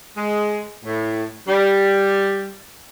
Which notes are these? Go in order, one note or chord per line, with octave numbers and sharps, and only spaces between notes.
G#3
A2
G3